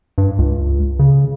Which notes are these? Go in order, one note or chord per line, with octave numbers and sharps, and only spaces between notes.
G2
C#2
C#3